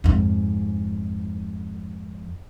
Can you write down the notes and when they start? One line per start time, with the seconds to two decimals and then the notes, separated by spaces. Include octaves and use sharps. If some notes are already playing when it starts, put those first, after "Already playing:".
0.04 F2 G#2